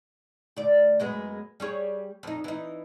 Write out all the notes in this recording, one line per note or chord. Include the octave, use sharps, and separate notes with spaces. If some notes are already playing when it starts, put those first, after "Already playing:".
D2 D5
F#2 G#3 B3
G3 G#4 C#5
F2 D#4
E3 D#4